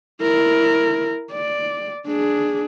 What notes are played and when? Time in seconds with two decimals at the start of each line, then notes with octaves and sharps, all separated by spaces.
0.22 E4 A#4
1.32 D5
2.07 D4 G#4